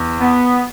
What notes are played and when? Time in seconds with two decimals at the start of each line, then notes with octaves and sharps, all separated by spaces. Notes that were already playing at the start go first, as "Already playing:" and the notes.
Already playing: E2
0.20 B3